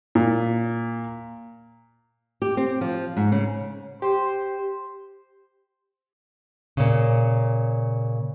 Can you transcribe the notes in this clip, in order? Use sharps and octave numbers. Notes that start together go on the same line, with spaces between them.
A#2
G4
C4
F3
G#2
C#3
G4 C5
A#2 C#3